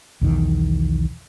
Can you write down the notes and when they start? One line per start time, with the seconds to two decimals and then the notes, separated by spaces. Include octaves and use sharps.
0.21 B1 E2 D#3